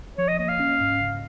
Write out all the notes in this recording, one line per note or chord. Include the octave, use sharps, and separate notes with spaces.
F3 C#5
D#5
A#3 D#5
F5
C#4
G#2
C#3